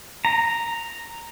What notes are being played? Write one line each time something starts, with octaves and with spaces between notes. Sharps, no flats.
A#5